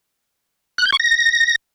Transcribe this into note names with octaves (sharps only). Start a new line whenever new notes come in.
F#6
G6
C#6
A#6